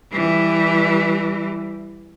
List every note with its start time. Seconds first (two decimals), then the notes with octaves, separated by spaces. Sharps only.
0.12 E3 G3